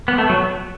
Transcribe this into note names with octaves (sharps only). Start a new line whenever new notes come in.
B3
A3
F#3